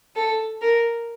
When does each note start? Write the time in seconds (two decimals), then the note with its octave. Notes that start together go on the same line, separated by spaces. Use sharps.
0.16 A4
0.62 A#4